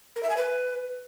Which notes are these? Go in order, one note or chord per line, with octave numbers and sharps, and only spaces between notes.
A#4
E5
G#5
B4